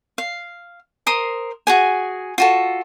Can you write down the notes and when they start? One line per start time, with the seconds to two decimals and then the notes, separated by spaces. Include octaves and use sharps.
0.18 F5
1.07 A#4 C5 C6 D#6
1.67 F#4 G#4 G#5
2.38 F4 F#4 A4